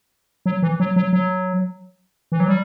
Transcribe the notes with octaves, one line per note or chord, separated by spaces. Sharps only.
F#3
E3
F#3
F#3
F#3
E3
F#3
G3